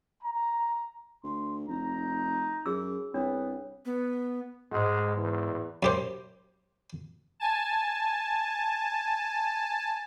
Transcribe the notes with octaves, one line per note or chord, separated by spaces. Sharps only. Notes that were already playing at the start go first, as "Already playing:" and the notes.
A#5
D2 C6
F1 D#4 A#5
F#2 G#4 E6
C2 B3 D4 C#5
B3
G#2 G#3 F#4
E2
F#2 G4 C5
G#5 A5